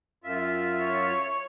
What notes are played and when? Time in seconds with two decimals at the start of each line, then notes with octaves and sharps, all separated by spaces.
0.24 F#2 F4 E5
0.81 C#5